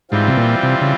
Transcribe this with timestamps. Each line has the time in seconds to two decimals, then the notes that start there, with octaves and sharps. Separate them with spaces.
0.11 G#2 E3 G3 C4 F4
0.28 C3
0.37 A#2
0.63 C3
0.81 C#3